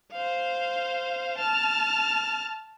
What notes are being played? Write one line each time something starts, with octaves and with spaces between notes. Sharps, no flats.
C5 F5
A5 F6